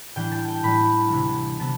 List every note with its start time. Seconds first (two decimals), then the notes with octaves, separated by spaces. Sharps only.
0.16 A2 E3 G3 D4 G5
0.32 A5
0.48 G5
0.63 A2 E3 G3 D4 B5
1.10 D2 C3 E3 B3 E4
1.59 C3 E3 B3 E4 A5